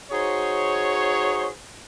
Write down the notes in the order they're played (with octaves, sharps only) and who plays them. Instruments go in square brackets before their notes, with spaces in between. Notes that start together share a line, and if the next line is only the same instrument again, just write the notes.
[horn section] D#4 F#4 G#4 C5 C#5